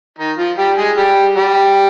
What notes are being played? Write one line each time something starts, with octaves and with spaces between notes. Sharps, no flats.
D#3 D#4
F3 F4
G3 G4
G#3 G#4
G3 G4
G3 G4